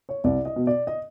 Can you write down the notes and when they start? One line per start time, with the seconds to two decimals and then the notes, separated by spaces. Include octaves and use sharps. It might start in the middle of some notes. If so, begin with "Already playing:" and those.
0.09 C#5
0.24 C2 D5
0.45 D#5
0.56 B2
0.67 D5
0.87 D#5